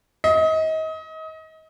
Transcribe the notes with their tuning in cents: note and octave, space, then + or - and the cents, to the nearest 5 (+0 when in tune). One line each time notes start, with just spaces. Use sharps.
D#5 +30